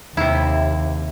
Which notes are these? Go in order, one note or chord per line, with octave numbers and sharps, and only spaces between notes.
D#2 C3 E4